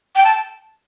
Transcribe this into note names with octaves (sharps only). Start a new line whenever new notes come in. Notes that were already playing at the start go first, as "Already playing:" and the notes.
G5
A5